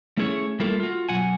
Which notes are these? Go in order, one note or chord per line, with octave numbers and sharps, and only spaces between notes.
A3 C#4 E4 G#4 B4 C#5
G3 A3 A#3 E4 F4 A4
F4 F#4
B1 D#3 F#3 F#5 G#5